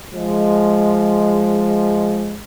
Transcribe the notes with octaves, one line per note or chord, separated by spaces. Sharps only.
F3 G#3